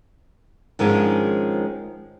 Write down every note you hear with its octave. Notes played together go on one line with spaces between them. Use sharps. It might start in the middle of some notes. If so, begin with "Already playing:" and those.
G#2 D#3 F3 G#3 C#4 D4